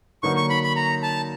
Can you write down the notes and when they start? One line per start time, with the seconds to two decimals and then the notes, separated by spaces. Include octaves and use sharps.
0.23 D3 F#3 A#3 D#4 F#4 C#6
0.37 C#6
0.50 B5
0.63 B5
0.76 A#5
1.03 A5